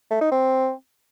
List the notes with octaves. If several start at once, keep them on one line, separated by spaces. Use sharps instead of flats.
A3
D#4
C4